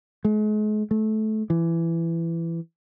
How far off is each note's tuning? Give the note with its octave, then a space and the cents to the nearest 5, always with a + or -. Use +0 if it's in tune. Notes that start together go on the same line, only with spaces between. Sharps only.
G#3 +40
A3 -20
E3 +15